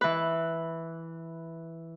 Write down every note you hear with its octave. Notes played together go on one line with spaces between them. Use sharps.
E3 B4